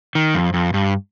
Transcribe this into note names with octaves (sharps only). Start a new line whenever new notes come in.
D#3
F2
F2
G2